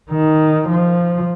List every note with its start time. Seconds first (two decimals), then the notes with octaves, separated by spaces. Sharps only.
0.10 D#3
0.68 F3